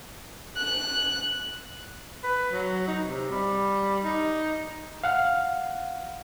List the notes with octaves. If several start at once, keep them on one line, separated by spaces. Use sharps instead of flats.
F#6
B4
F#3
D#4
C3
G3
D#4
F5 F#5 F6